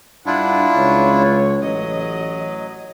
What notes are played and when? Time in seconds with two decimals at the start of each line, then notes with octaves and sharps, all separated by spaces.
0.26 G2 D4 E4 F4 F#5
0.74 C#2 C#5
1.63 A1 F#3 D#5